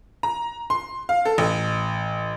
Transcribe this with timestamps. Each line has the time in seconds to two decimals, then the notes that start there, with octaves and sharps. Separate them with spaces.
0.23 A#5
0.70 C6
1.09 F5
1.25 A4
1.38 A1